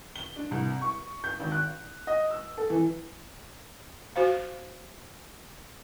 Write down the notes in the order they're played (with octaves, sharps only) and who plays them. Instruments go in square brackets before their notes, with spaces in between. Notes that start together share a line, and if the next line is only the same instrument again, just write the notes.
[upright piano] G7
D4
C2
C#6
G6
G#1
F#6
D#5
E6
A4
E3
[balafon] F#4 C5 F5